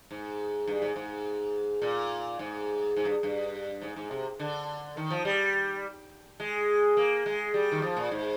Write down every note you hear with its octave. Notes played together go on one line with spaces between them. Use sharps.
G#2
G2
G#2
G#2
A#2
G#2
G#2
G2
G2
G#2
G#2
C3
D3
D#3
F3
G3
G#3
A#3
G#3
G3
D#3
F3
A#2
G#2